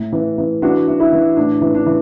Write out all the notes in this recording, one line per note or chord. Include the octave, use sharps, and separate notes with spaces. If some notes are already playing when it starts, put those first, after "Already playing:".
Already playing: A2
E3
E3
E3 D4 F#4
E3
E4
E3
A2 D4
E3
D4
E3